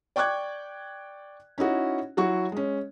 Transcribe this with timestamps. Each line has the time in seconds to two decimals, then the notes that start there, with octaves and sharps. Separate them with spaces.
0.16 D5 G5 C#6 D6 F#6 G#6
1.58 C#4 D#4 E4 F#4
2.17 F#3 E4 F#4 C#6
2.52 G#3 C#4